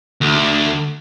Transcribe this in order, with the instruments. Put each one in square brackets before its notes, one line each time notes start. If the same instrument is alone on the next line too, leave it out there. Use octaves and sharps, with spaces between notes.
[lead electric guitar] D2